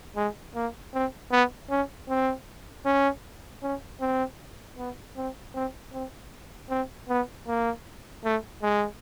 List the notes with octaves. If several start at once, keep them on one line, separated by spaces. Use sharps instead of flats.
G#3
A#3
C4
B3
C#4
C4
C#4
C#4
C4
B3
C4
C4
C4
C4
B3
A#3
A3
G#3